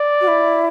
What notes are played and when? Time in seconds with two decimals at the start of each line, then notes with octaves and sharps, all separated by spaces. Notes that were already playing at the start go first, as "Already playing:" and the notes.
Already playing: D5
0.21 F#4
0.27 E4